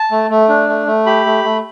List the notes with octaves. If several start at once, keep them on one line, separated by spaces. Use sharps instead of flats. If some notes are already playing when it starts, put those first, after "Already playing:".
Already playing: A5
A3
A3
D4
A3
A3
G4 B5
A3
A3